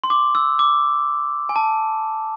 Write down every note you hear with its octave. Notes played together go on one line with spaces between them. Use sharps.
C6
D6
E6
D6
G#5
A5